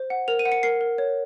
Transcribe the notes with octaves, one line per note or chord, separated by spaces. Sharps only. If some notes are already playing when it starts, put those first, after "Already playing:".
Already playing: C5
F#5
A#4 F7
D#7
F#5
C#7
A#4 C7
A#4
C#5